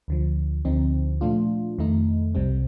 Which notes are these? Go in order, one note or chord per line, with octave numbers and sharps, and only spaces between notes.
D2 D3 F3
D2 D3 F3 C4 D#4
A#2 F3 A3 D4 F4
F2 D#3 A3 D#4
C2 C3 G3 C4